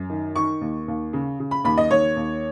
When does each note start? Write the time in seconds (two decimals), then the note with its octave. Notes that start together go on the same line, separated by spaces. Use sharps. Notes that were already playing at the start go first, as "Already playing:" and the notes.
Already playing: F#2
0.10 D#3
0.36 D#3 C#6
0.61 D#2
0.88 D#2
1.13 C#3
1.40 C#3
1.51 B5
1.64 D#2 B5
1.78 D#5
1.91 D#2 C#5
2.16 D#2